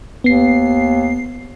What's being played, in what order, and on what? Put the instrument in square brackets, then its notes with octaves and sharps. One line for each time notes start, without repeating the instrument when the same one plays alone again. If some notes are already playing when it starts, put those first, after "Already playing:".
[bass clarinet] D#2 [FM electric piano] B3 C7